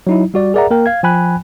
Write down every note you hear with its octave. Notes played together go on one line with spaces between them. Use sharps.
F#3 D#4 E4
G3 F#4 D5
G#4 A#4 D5 E5 F#5 A#5
A#3 A#4 G5
F5 G#6
F3 G5 G#5 B5 F#6